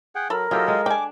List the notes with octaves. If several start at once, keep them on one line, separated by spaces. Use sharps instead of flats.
G#4 F#5 G5
F#3 A4 A#4 B5
E3 F#3 F4 G4 A4 D#5
G#3
D4 G5 G#5 D6